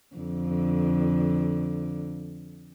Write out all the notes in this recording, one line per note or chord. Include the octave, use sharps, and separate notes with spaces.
F2 D3